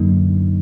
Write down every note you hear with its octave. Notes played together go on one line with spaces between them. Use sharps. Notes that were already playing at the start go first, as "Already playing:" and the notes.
Already playing: F#2 D3 F#3 A#3 D#4